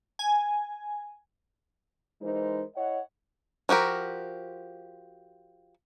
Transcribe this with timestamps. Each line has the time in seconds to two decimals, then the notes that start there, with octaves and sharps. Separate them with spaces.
0.19 G#5
2.21 E3 G#3 D#4 A#4 C5
2.76 E4 C#5 D#5 F#5
3.69 F3 F#4 G4 A#4